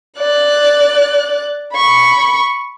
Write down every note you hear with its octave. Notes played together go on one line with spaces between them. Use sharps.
D5 F#6
B5 C#6